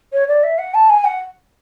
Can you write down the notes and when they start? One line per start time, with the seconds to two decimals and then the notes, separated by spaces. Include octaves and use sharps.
0.13 C#5
0.28 D5
0.43 E5
0.58 F#5
0.74 A5
0.89 G#5
1.05 F#5